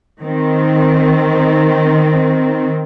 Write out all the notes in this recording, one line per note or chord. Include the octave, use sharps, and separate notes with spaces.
D#3 C4